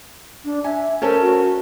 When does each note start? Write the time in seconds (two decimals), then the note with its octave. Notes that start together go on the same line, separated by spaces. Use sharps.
0.45 D4
0.64 E5 G#5
1.02 C#4 A4 A#4 C5
1.21 F#4